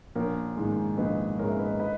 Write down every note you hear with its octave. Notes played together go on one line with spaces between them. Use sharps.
A#1 A#4 C#5
G#2 D#3 G#3
A#1 B4 D#5
G#2 D#3 G#3 A#4 C#5
E5
B4 D#5
B4 D#5